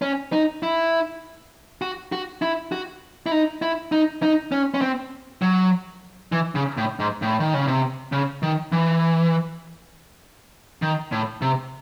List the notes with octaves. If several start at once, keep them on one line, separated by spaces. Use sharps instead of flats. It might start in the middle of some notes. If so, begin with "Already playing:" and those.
C#4
D#4
E4
F#4
F#4
E4
F#4
E4
D#4
E4
D#4
D#4
C#4
C#4
C4
F#3
E3
C#3
A2
G#2
A2
D#3
C#3
C3
C#3
D#3
E3
D#3
A2
C3